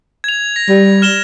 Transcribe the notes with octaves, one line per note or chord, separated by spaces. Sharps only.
G#6 F7
A#6
G3
F6 E7 G7